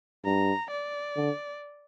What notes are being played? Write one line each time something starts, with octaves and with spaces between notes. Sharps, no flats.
G2 A#5
D5
D3